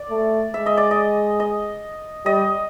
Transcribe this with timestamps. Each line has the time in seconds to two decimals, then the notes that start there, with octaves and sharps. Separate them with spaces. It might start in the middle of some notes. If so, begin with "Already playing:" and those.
Already playing: D5
0.10 A3
0.54 G#3 E5
0.66 D#5
0.77 D5
0.91 D#5
1.40 D#5
2.26 G3 D#5